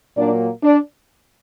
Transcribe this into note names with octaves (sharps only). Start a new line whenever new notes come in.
A#2 F#3 A#3 D4 D5
D4 D5